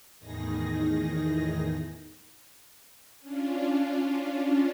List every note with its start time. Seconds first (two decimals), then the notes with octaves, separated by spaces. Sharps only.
0.19 E2 A2 D#3 D#4 G#4 A#6
3.20 C#4 D4 F4